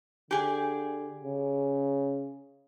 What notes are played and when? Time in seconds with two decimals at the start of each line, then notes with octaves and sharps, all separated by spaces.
0.31 D3 G4 G#4
1.24 C#3